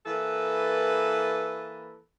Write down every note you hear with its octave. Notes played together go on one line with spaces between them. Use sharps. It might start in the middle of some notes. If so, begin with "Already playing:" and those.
E3 A#3 A4 B4